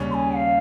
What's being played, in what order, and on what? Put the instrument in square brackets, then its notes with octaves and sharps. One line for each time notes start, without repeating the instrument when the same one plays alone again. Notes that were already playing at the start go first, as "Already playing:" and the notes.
Already playing: [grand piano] D#2 C#3 G3 C#4
[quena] C6
G#5
F5